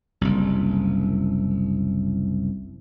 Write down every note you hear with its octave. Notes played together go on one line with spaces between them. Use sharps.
F#1 C2